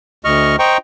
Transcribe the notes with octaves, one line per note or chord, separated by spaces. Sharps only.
D2 D#5 C#6 F6
C5 D#5 G5 A#5 C#6